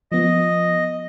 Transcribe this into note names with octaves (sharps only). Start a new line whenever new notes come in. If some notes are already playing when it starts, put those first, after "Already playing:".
F3 B3 D#5